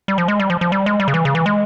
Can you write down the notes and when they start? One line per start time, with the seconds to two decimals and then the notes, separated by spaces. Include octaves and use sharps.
0.08 G3
0.18 F3
0.28 G#3
0.40 G3
0.50 F3
0.61 F3
0.72 G3
0.86 G#3
1.00 G3
1.08 C#3
1.14 E3
1.25 C#3
1.35 E3
1.46 G#3